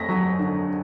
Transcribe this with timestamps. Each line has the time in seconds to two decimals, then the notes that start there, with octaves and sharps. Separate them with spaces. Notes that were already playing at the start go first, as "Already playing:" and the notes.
Already playing: F2 A3 A#6 B6
0.09 F#3
0.39 D3